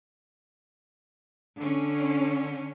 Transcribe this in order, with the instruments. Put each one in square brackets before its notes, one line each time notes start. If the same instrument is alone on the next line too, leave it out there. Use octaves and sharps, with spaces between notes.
[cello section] D3 C#4